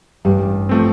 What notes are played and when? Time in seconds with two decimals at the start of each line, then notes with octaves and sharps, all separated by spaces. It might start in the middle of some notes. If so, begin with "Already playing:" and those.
0.25 A1 G2 G3
0.69 F3 A3 C4